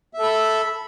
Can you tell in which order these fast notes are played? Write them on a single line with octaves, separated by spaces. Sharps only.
E5 A4 B5